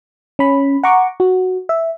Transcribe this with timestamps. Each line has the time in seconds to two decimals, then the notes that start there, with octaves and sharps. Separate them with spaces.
0.39 C#4 B5
0.83 F#5 A#5 C#6 D6
1.20 F#4
1.69 E5